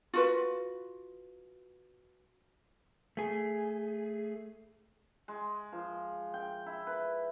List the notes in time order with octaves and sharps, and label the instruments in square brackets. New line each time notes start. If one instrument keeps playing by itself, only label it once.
[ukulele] F4 F#4 B4
[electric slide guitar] A3 G#4
[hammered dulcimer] G#3
F3
G5
E4
B4